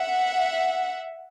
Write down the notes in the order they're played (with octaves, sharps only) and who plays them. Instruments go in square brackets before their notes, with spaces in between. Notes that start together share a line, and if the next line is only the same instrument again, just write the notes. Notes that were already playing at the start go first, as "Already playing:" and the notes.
Already playing: [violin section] E5 F#5